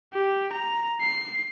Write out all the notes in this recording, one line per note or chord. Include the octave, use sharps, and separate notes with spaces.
G4
A#5
C7